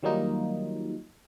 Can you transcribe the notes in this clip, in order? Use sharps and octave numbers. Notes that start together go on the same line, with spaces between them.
D#3 F#3 G3 A#3 D#4 F4